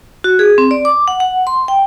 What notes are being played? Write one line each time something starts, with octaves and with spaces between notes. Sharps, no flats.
F#4
G#4
C4
D5
D6
F#5
F#5
C6
G5